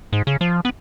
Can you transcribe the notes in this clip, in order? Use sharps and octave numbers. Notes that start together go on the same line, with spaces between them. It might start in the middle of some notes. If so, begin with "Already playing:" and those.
G#2
C#3
F3
B3